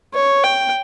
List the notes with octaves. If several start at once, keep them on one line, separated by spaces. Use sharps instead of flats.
C#5
G5